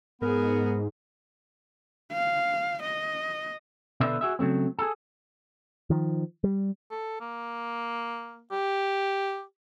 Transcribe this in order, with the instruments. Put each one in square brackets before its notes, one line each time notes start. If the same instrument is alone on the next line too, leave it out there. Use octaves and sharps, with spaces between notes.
[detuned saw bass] G#2 [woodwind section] B3 A#4 [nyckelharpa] G#4
[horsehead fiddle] F5
D#5
[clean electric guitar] B2 D3 D4 B4 C5 E5
F#4 G#4 E5
C#3 F#3 A3 C4
G#4 A4
[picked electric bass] D#3 F3
G3
[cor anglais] A4
A#3
G4